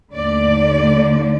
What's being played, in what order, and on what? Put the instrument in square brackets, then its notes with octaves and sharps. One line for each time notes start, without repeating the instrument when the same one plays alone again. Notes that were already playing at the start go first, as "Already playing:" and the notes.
[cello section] D#2 D3 A3 D5